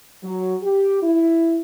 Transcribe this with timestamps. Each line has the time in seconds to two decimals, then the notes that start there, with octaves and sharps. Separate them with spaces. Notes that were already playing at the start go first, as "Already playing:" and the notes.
0.23 F#3
0.62 G4
1.02 E4